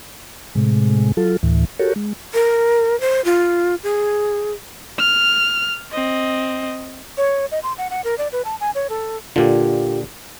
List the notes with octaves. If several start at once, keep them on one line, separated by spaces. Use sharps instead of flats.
A2 C3 G#3
F#3 F4 A4
D2 A2 E3
F#4 G4 A4 A#4 C#5
G#3
A#4
C5
F4
G#4
F6
C4 D#5
C#5
D#5
C6
F#5
F#5
A#4
D5
B4
A5
G#5
C#5
A4
A#2 D3 F4 G4